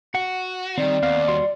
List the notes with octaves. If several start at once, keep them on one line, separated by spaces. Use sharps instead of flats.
F#4 F#5
D#3 G3 C4 D5
D#2 B3 C4 F5
G3 F#4 C6